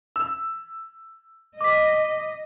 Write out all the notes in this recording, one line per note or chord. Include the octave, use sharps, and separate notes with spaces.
E6
D#5 D6 B6